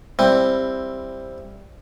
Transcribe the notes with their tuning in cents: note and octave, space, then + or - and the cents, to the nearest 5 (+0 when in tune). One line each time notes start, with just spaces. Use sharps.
G3 +10 C4 +10 E4 +10